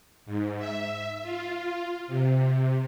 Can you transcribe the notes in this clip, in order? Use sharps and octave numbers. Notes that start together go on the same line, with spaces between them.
G#2
E5
F4
C3